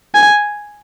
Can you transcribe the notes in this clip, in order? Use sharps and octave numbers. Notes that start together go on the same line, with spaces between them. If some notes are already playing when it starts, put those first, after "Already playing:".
G#5